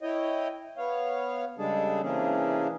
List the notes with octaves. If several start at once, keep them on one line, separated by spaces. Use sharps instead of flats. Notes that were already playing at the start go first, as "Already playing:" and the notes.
E4 C#5 D#5 G5
B3 C#5 F5
C#3 G3 G#3 D4 G#4 A4
C3 E3 A#3 C#4 D4 G#4